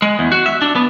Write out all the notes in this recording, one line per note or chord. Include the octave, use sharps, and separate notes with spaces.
G#3
E2
F#4
E5
D4
B3